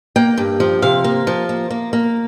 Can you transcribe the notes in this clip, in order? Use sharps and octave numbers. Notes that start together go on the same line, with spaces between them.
A#3 G5
G2
F3
C3 F5
A#3
F3
A#3
A#3
A#3